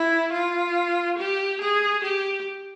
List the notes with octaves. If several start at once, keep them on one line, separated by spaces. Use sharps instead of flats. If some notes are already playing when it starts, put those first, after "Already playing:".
Already playing: E4
F4
G4
G#4
G4